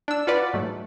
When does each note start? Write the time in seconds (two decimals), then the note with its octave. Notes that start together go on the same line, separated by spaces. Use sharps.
0.08 D4 E6
0.27 F4 F#4 B4 D5
0.53 G#2 F#3 A3